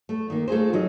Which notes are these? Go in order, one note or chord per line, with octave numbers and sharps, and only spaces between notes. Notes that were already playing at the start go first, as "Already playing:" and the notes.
A3
D#3 A#3
A3 F4 G#4 C5
F3 F#3 D#4